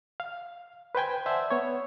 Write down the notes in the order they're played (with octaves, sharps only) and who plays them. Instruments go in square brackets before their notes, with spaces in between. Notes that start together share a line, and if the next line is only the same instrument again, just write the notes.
[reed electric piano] F5
B4 C5 G5 G#5
C5 D5 E5 F#5 G#5 A5
B3 C#5